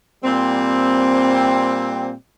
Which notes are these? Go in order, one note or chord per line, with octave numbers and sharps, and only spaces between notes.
A#2 G3 C4